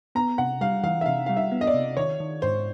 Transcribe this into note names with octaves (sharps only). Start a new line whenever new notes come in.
B3 A#5
C3 F#5
G3 F5
E3 F5
E5
C3 F5
G3 F5
E5
B3
D#5
D5
C3
D#3 C#5
D#3
G#2 C5